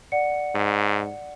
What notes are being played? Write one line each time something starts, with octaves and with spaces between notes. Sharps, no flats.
D5 F#5 C#7
G#2